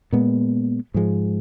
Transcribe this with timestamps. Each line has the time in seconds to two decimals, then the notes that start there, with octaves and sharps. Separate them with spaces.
0.12 A#2 G#3 B3
0.94 G#2 F3 G#3